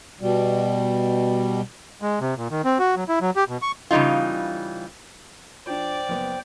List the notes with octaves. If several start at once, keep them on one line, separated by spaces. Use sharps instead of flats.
B2 G3
G#3
C3
A#2
D#3
C4
F#4
F#3
E4
F#3
G4
B2
C#6
C#3 E3 G3 D#4 F4
F3 D4 C5 D5 G5
F#1 B3